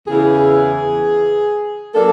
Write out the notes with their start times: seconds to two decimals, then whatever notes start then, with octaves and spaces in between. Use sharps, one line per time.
0.08 E2 C#3 E3 G#4
1.94 F#3 A#3 D4 A4